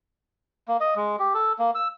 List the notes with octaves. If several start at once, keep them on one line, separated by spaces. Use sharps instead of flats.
A#3
D#5
G#3
G4
A4
A#3
E6